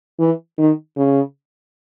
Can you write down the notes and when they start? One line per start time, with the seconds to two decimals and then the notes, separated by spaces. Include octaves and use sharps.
0.19 E3
0.58 D#3
0.97 C#3